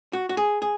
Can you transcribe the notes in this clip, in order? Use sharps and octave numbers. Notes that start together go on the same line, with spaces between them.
F#4
F#4
G#4
G#4